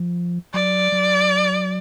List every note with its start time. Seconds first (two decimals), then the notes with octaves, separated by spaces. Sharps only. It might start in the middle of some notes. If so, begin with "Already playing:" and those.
Already playing: F3
0.54 F#3 D5
0.92 F#3